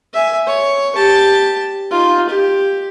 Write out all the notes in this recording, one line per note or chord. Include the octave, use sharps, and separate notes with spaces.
E5 G#5
C#5
G4 A5
D#4 F4
G4